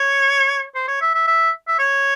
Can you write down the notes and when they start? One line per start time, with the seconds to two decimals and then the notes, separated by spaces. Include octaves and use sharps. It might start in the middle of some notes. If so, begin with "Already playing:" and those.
Already playing: C#5
0.75 C5
0.88 C#5
1.02 E5
1.14 E5
1.27 E5
1.68 E5
1.79 C#5